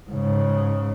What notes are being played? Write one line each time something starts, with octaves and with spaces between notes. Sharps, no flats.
G#2 C#3